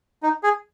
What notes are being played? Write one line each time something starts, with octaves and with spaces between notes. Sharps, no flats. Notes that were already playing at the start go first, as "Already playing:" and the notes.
D#4
G#4